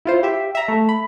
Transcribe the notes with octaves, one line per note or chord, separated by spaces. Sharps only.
E4 F4 C5
G4 E5
E5 A#5
A3
B5